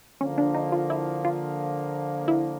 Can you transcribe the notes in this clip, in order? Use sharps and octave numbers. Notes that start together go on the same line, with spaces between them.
D3 F3 A#3 C#4
D4
D#4
F4
E4
F4
E4